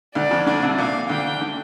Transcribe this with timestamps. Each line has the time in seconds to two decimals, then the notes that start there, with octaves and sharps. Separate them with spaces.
0.15 D2 D3 D5
0.31 F2 F3
0.46 D3 D4
0.62 C2 C3
0.78 A#2 F5
1.10 D2 D3 G5
1.41 D3